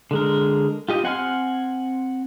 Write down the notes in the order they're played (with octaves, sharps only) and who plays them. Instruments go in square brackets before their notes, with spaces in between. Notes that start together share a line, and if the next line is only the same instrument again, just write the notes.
[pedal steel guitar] D3 G#3 A#4
F4 G4 D#5
C4 F#5 G#5 C6 F6